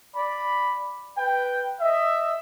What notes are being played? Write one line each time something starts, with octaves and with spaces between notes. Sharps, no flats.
D5 B5
B4 G5
D#5 E5